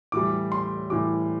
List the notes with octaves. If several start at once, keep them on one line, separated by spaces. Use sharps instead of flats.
A2 E3 G3 D6
C6
A2 E3 G3 D6